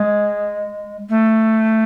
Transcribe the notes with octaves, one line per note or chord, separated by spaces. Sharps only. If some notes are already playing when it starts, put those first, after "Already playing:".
Already playing: G#3
A3